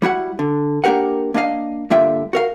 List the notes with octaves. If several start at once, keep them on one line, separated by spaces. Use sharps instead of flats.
G3 E4 F#4 F#5
D3
A#3 D4 G4 A#4 F#5
A#3 D4 D5 D#5 F5
G2 D3 A#3 F4 E5 G5
F#4 A#4 F5